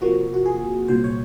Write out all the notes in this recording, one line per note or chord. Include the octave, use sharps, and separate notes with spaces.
C3 F3 A#3 F#4
F#4
G#4
C2 A#2 F#3 C5
C#5